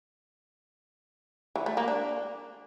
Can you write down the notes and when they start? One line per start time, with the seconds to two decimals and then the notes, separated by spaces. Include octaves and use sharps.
1.56 E3
1.66 A3
1.77 A#3
1.88 D4